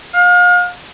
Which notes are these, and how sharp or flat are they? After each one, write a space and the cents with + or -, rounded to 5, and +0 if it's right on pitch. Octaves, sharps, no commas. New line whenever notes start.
F5 +35